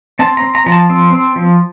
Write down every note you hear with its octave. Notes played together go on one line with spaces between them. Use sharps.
C4 A5
A#5
C4
A#5
F3 A#5
A5
C4
C4
F3